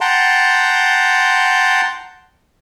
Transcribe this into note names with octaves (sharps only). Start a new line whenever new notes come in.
F#5 G5 A5 A#5 C6